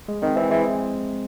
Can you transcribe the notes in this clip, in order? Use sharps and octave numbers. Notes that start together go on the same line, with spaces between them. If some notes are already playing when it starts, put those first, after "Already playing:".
G#3
D#3 C4
E3 C4
E3 G#3